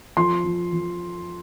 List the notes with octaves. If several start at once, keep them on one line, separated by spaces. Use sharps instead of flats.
F3 C6
F3
F3